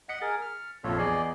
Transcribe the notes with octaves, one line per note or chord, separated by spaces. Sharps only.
D#5 F#5 B6 C#7
G#4 A#4 A6
F6
A#1 F2 F4 A4 C#5
E2 G#4 D5 D#5 C7